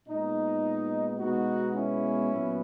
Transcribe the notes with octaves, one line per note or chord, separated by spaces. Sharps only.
A#2 G#3 B3 D#4
B2 G#3 B3 D#4 F#4
C#4 E4
A#2 F#3 B3